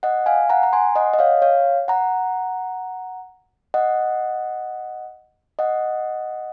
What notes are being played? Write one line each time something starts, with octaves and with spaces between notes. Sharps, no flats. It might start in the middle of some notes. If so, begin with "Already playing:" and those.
D#5 F#5
F5 G#5
F#5 A#5
A#5
G#5 C6
D#5 F#5
D#5
C#5 F5
C#5 F5
F#5 A#5
D#5 F#5
D#5 F#5